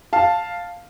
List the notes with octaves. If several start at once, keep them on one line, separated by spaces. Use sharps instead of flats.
F5 A5